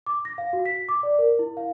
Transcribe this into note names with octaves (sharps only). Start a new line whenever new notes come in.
D6
A#6
F5
F#4
B6
D6
D5
A#4
E4
F5